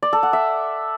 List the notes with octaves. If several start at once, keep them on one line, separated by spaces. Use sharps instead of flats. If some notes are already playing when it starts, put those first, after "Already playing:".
D5
A4
F#5
E5